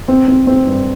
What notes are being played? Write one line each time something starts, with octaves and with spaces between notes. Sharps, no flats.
C4
C4
C4
G2